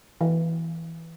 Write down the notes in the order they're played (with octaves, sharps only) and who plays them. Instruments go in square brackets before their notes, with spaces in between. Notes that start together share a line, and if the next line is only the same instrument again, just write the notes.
[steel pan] E3